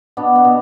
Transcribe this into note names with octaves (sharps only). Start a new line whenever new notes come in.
B2 B3 D4
B3
B2